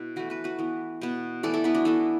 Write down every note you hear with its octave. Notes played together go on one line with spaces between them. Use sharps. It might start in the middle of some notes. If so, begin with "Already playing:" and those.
Already playing: B2 B3 E4
E3 A3 F#4 B4
F#4 B4
F#4 B4
E3 B3
B2 B3
E3 A3 A4 D5
E4 A4
B3 E4
D4 F#4
E3 B3 E4 A4